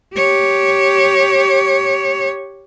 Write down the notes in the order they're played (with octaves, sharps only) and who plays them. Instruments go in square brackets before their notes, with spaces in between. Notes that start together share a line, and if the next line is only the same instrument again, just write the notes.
[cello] G4 C#5